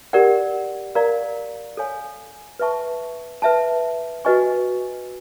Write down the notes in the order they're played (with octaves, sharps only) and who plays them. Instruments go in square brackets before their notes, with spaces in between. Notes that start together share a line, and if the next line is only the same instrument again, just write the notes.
[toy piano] G4 A#4 D5 F#5
A#4 D5 F5 A#5
A4 C#5 F5 G#5
B4 E5 A5 C#6
B4 E5 A5
F#4 B4 D#5 G#5 C#6